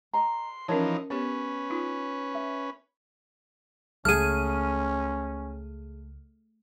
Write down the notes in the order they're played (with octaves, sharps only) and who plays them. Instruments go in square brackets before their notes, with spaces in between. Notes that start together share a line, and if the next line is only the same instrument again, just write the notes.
[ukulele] D#5 A#5 [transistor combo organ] C6
[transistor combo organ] E3 F3 D#4 [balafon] C#4 A#4 A5 [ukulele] C#5
[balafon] B3 G4 [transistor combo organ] C#4 B4 [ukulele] C#5
[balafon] D#4 F4
[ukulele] E5
[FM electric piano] C#2 [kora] A3 G#4 [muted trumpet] C#4 [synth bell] F6 D#7